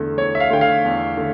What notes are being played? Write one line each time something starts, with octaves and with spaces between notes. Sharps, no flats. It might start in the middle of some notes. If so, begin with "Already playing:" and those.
Already playing: E2 D3 A3
E2 C#5
E5
F5
D3 A3 G5
F5
E2
D3 A3